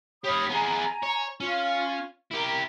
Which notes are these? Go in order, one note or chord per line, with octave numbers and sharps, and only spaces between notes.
G4 C#5 F5 B5 D#6
B3 G#4 G#5 A#5
C#5
C#4 F4
E4 G4 A#4